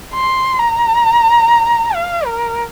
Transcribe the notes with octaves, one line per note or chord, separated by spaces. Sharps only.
C6
A#5
F5
A#4